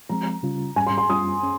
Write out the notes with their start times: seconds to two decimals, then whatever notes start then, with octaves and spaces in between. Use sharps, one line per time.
0.09 F3 G#3 C4 A#5
0.43 C#3 G3 C#4 F4
0.76 G#2 G3 C#4 G#5
0.87 C6
0.98 C6
1.09 G3 C#4 F4 D#6
1.43 C#4